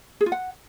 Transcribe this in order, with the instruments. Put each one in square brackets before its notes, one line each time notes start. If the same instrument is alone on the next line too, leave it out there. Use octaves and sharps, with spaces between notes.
[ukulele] G#4
F4
F#5